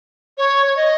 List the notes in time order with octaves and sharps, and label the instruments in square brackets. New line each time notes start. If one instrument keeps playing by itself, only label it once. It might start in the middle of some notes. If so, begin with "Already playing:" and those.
[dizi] C#5
C#5
D#5